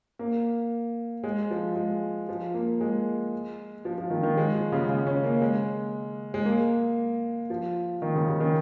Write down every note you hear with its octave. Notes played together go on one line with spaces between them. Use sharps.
A#3
G#3
F3
G#3
F3
A#3
G#3
F3
F3
D#3
D#3
G#3
F3
C#3
C#3
C#4
A#3
G#3
G#3
A#3
F3
D#3
C#3
C#3
D#3